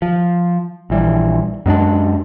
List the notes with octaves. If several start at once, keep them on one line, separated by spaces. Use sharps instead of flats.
F3
A#1 E3 G3
F#2 G#3 C4 D4